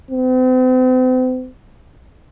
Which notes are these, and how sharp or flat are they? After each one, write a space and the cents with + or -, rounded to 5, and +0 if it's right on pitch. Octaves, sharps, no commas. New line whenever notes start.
C4 -40